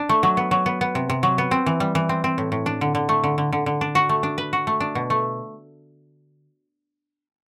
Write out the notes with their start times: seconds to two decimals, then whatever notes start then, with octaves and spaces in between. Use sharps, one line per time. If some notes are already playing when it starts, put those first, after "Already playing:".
Already playing: D4
0.09 A3
0.23 F#3
0.37 B3
0.51 F#3
0.66 B3
0.81 B3
0.95 C3
1.10 C3
1.23 F#3
1.38 B3
1.51 C4
1.66 E3
1.80 G3
1.95 E3
2.09 C4
2.24 C4
2.38 A2
2.52 A2
2.66 D4
2.81 D3
2.95 D3
3.09 A3
3.24 D3
3.38 D3
3.52 D3
3.66 D3
3.81 D4
3.95 F#4
4.09 A3
4.23 D4
4.38 B4
4.53 F#4
4.67 A3
4.80 D4
4.95 B2
5.10 A3